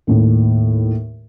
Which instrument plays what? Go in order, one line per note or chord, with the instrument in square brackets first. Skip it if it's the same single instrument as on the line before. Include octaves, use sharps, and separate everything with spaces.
[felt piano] D#2 A2